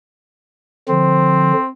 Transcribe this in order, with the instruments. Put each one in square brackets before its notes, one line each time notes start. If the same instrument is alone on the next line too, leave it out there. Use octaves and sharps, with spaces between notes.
[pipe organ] D3 F3 [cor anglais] C4